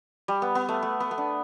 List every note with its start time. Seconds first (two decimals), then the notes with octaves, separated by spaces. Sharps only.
0.28 G3
0.42 B3
0.55 B3
0.69 A3
0.83 A3
1.00 B3
1.11 B3
1.18 D4